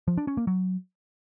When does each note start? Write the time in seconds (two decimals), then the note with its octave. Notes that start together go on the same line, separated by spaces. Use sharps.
0.08 F3
0.18 D4
0.27 C#4
0.37 A#3
0.47 F#3